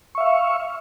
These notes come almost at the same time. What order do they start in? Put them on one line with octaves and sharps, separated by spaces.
C#6 E5 F5